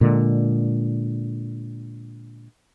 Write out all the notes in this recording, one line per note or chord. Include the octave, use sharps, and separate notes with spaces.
A#2 D3 G#3